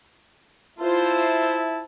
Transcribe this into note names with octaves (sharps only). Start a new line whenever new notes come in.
E4 F4 C5 E5 A5